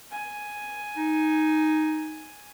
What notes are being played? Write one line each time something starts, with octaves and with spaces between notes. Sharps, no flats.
G#5
D#4